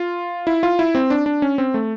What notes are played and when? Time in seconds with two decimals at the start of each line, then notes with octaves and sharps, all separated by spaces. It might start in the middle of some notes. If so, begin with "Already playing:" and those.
Already playing: F4
0.47 E4
0.63 F4
0.79 E4
0.95 C4
1.10 D4
1.26 D4
1.42 C#4
1.58 C4
1.74 A3